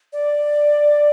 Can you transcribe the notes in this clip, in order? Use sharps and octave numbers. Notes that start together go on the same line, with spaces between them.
D5